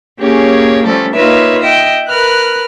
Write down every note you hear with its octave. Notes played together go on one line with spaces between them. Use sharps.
A#3 C#4 G4 G#4 C#5
F3 G3 A3 C#4 A4
A#3 D#4 F4 B4 C#5 E5
D#5 E5 G5
A#4 B4 F6 F#6